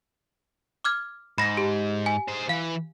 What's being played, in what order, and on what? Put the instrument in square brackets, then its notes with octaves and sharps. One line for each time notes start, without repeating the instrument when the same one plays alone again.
[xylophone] D6 F6 G#6
[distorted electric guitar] G#2 [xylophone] B5 A#6
[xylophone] G4
G#5
[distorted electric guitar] G#4 C5
[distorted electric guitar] E3 [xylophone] F5